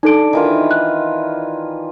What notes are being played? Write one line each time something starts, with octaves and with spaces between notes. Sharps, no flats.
D4 D#4 A4 D7
D#3 E3 F4
F#6